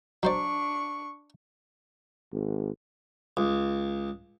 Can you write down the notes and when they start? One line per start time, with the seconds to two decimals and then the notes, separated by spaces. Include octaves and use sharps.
0.23 F#3 D4 C5 D5 C#6
2.32 G#1
3.37 C#2